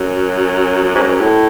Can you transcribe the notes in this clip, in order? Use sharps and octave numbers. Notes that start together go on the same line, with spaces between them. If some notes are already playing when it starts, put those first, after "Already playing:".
Already playing: F#2
F#2
G#2
F#2
A2